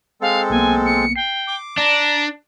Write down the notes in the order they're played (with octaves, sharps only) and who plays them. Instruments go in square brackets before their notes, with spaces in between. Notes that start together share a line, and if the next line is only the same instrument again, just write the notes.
[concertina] G#3 C4 A4 [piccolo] F5
[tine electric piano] B1 A#3 B3 [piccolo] G#5
[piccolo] C#7
[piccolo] G5 [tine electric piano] C7
[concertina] D6
[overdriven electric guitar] D4 [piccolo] A#5